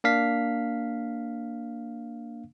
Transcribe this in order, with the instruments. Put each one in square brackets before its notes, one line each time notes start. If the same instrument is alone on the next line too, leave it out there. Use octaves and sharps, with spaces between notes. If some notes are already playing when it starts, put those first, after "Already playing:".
[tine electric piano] A#3 D4 F5 B6